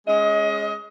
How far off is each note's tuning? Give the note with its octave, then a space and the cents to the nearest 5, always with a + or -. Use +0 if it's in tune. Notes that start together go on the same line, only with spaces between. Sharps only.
G#3 +0 C#4 +0 D#5 +30